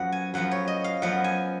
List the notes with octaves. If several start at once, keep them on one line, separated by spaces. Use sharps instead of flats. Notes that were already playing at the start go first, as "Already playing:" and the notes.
Already playing: F#2 F3 B3 F#5
G#5
F#2 F3 B3 F#5
C#5
D#5
F5
F#2 F3 B3 F#5
G#5